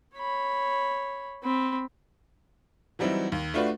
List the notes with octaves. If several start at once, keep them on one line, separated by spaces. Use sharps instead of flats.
C#5 B5
C4 B5
E3 F#3 G3 C4 D#4 E4
D#2
A3 D4 F4 F#4 B4 D5